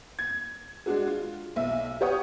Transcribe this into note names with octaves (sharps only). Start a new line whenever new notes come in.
G#6
G#3 D4 F#4 G#4
F4
B1 E5
G4 C#5 F#5 D#6